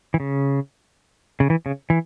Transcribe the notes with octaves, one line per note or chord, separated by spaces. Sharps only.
E3
C#3
C#3
E3
C#3
E3